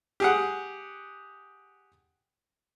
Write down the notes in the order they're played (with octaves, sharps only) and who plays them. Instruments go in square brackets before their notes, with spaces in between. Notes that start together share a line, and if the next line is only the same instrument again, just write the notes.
[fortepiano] G4 G#4 F#5